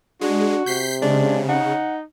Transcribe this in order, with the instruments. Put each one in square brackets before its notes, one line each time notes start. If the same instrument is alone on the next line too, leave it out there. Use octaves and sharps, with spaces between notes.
[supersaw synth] G#3 [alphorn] D4 [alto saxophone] F#4
[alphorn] C3 [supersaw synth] G6 B6 C7
[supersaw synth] C#3 [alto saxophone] G#3 [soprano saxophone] D4
[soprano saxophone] D#4 [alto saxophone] F#5